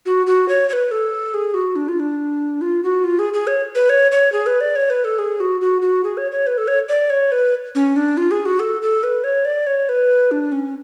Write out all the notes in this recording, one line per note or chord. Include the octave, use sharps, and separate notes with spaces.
F#4
F#4
C#5
C#5
B4
A4
G#4
F#4
D4
F4
D4
F4
F#4
F4
G#4
G#4
C#5
B4
C#5
C#5
G#4
B4
D5
C#5
B4
A4
G#4
F#4
F#4
F#4
G#4
C#5
C#5
B4
A4
C#5
D5
C#5
B4
C#4
D4
F4
G#4
F#4
A4
A4
B4
C#5
D5
C#5
B4
D4
C#4